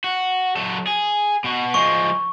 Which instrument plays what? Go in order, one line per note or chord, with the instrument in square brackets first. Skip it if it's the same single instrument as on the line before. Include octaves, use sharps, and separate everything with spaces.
[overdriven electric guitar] F#4
F#3 A4
G#4
B2 F#4
[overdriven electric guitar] F3 G#3 [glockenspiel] C#6